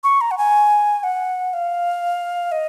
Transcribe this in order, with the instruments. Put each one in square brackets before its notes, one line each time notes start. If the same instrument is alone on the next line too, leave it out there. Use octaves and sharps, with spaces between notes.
[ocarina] C#6
A#5
F#5
G#5
F#5
F5
D#5